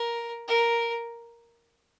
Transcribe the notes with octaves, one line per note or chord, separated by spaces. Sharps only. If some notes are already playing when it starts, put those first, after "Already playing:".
Already playing: A#4
A#4